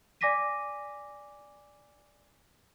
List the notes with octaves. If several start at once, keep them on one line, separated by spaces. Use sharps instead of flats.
D5 G#5 D6 A#6 B6 D#7